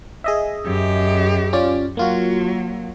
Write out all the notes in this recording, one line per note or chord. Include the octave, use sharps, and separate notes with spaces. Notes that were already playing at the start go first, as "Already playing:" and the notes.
G#4 D#5 E5
F#2 G4
C#4 F4 D5
F#3 A#3 F4 F#4